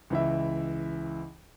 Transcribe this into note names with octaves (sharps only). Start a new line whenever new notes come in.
C#2 E3 E5